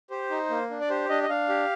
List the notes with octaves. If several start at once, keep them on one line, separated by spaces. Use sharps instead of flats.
G4 C5
D#4
A#3
D4
D5
G4 C5
D4 D#5
D#5
D4 F5
G4